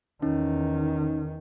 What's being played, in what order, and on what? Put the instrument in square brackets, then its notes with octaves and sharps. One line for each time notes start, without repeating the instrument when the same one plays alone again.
[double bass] E2 D#3 [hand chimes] C#4 D#4